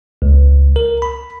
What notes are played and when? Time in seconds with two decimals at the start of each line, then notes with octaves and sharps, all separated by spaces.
0.22 C#2
0.76 A#4
1.02 B5